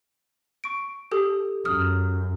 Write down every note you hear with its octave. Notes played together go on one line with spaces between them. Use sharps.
C#6 D7
G4 A4 D#6
F#2 D#6 F6